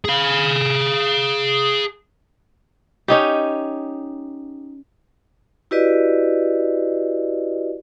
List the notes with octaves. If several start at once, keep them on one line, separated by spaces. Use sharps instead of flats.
G#4 F5
C#4 D#4 G4
E4 F#4 G4 B4 D5 D#5